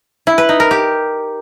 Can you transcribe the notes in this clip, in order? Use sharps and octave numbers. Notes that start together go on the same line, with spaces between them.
E4
B4
D#4
A#4
G4